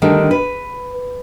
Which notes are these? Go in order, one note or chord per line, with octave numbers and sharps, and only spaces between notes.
D3 D#3 G3 A3 D4
B4